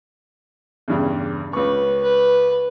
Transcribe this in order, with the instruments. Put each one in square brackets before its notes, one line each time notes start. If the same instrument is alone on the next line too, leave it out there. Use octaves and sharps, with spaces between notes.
[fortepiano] E2 G2 C#3
[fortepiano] C#2 C#6 [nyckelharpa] B4
[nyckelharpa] B4